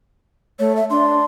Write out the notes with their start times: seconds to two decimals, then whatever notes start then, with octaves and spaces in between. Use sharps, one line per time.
0.59 A3 C#5
0.76 E5
0.90 D4 C6